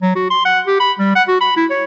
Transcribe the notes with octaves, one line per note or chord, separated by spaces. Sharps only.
F#3
F#4
C6
F#5
G4
B5
G3
F#5
F#4
B5
E4
C#5